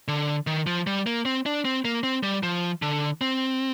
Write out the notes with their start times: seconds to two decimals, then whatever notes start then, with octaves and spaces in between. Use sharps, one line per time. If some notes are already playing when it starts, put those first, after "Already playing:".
0.08 D3
0.47 D#3
0.67 F3
0.87 G3
1.06 A#3
1.25 C4
1.46 D4
1.65 C4
1.85 A#3
2.03 C4
2.23 G3
2.43 F3
2.82 D3
3.21 C4